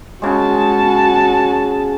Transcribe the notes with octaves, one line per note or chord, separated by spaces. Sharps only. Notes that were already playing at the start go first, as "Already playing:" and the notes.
C#3 G#3 F#4 A5